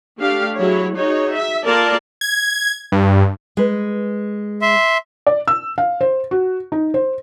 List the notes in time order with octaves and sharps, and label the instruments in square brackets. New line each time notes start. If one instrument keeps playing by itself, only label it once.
[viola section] A3 D4 G4 F5
F#3 E4 G#4 C#5
D#4 F#4 G#4 C#5
E5
A#3 F4 A4 A#4 D5 A5
[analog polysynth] G#6
G2
[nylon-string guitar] G#3 B4
[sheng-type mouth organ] E5 C6
[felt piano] D5
E6
F5
C5
F#4
D#4
C5